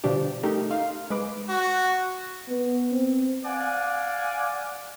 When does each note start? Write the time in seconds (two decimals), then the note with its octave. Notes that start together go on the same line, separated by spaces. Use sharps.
0.04 B2 D3 F3 G3 D4 G4
0.43 A3 D#4 G4 A#4
0.71 D#4 F5 C6
1.10 G#3 B4 D6
1.49 F#4
2.48 B3
2.92 C4
3.45 D5 F5 F#5 G#5